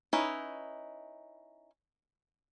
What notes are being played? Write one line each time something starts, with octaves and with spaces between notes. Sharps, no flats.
C#4 D#4 E4 B4